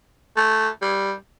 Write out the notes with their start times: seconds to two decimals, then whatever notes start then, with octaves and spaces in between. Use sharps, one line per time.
0.37 A3
0.82 G3